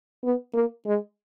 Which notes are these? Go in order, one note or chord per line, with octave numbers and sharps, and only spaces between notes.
B3
A#3
G#3